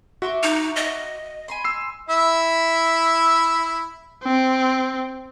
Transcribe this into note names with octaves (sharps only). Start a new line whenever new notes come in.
F#4 E5 C6 D6
D#4
D#5
G#5 B5 C6
E6 C7
E4 E5
C4